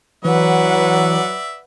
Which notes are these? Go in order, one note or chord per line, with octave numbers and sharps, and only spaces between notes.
E3 F#3 B4 D5 E5 F#5